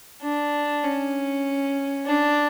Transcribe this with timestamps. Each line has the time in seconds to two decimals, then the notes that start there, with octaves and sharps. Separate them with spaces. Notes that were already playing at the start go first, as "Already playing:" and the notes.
0.23 D4
0.84 C#4
2.06 D4